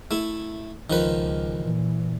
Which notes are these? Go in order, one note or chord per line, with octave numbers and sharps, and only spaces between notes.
A3 E4
C#2 D#3 F3 B4
A#2 E3